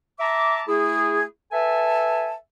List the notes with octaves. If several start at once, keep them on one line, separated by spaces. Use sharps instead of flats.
E5 A5 A#5 D6
A3 E4 G#4
A4 B4 E5 G#5 A5